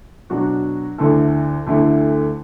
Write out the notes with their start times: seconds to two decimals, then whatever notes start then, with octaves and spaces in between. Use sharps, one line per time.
0.30 B2 F#3 D4 F#4
0.98 D2 D3 A3 E4 A4
1.67 D2 D3 A3 E4 A4